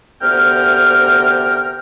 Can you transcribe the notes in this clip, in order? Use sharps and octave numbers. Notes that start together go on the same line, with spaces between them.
D2 C3 B3 A#4 G5 F6